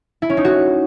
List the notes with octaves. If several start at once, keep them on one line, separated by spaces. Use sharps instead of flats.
E4
C#4
D#4
F#4